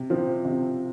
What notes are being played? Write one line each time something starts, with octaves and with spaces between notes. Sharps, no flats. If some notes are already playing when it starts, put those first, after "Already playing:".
Already playing: C3
F3 C4
C3